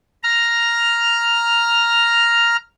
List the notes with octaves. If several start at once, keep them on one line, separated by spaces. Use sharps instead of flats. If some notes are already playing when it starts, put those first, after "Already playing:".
A#5 F6